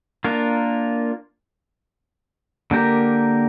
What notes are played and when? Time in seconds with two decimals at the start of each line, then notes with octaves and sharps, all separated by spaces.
0.24 A#3 D4 F4 A#4
2.71 D3 A#3 G4 A#4